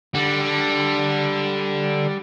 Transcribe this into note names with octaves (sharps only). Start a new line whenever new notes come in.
D3 G3